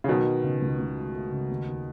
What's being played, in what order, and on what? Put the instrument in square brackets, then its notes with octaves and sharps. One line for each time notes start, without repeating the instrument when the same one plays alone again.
[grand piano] C#3
[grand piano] B2 D#3 [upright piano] F#3
[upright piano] F#3
C#3
C#2
C#2
A3
A3
C#3
D#2
D#2